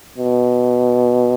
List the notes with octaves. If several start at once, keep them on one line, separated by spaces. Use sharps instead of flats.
B2